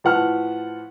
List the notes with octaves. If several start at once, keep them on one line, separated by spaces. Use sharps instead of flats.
A2 F3 B4 F#5 A5 F6